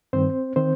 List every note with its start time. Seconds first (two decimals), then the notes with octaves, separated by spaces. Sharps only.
0.13 G2 D#3 C4 C5
0.56 D#3 C4 C5